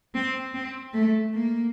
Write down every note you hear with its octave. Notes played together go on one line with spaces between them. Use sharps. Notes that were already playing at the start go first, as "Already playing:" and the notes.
C4
C4
A3
A#3